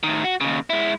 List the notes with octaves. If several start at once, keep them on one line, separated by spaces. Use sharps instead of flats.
A2 D#3
F#4
D#2 C#3
G#3 E4